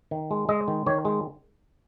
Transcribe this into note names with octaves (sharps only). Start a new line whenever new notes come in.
D#3
G#3
G#3 D#5
D#3
D#3 C#5
G#3